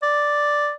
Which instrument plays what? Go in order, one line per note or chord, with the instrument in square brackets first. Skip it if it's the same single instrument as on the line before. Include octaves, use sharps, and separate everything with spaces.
[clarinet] D5